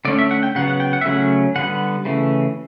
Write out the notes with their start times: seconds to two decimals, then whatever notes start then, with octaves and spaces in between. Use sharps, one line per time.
0.05 D3 A3 C#4 D5
0.19 E5
0.31 F#5
0.43 G5
0.55 C#3 F#3 B3 F#5
0.68 F#5
0.80 G5
0.93 F#5
1.01 E5
1.05 C#3 F#3 A3 C#4 F#5
1.56 D3 G3 B3 F#5
2.05 C#3 E3 A3